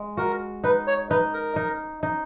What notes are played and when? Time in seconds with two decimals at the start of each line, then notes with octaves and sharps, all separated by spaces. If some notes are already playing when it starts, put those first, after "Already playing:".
Already playing: G#3
0.17 F#4 A#4
0.64 D#4 B4
0.87 C#5
1.10 D#4 B4
1.33 A#4
1.56 D#4
2.03 D#4